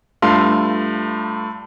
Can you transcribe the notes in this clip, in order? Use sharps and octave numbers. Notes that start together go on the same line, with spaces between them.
G2 A3 F4 F5 A5 C6